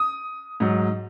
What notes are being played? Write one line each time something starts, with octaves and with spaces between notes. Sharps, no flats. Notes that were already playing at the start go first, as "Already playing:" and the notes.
Already playing: D#6
G#2 F#3